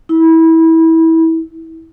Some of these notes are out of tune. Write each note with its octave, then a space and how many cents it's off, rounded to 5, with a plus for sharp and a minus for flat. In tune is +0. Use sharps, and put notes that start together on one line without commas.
E4 -25